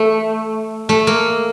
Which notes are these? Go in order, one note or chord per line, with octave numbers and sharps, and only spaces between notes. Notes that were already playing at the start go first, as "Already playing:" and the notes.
Already playing: A3
A3
A#3